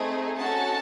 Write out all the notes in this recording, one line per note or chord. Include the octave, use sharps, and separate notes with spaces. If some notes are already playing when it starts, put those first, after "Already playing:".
Already playing: A3 C4 D#4 G#4
C#4 F#4 A4 A5